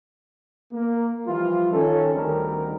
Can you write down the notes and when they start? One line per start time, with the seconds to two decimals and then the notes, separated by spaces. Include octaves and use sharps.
0.72 A#3
1.26 E3 F3 G3 F4
1.72 D#3 C#4 A4
2.13 D2 D3 D#3 G3 C4 A#4